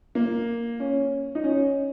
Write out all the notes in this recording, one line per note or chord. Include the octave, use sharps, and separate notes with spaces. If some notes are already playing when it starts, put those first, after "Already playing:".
A#3
C#4
D#4
C#4